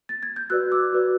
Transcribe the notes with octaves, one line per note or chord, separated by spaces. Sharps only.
A6
G#6
G6
F#4 B4 D5 E6 F#6
D6 E6
F#4 B4 D5